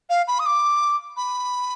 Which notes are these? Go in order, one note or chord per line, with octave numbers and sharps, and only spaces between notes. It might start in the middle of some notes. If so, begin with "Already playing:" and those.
F5
B5
D#6
D6
B5